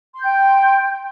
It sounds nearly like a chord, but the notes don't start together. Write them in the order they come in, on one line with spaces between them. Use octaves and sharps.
C6 G6 G5